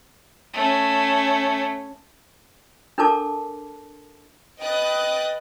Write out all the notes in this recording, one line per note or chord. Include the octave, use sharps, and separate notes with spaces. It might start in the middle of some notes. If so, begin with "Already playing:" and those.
A3 C#4
D4 A4 A#4 A5 D6
B4 D#5 G5 D#6 F#6 A6